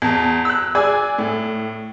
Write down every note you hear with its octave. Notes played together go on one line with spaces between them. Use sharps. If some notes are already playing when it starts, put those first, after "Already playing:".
E2 A5
E6 F#6
G#4 D5 G#5 E6
A2